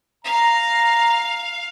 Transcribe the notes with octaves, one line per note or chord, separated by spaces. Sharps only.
F5 A#5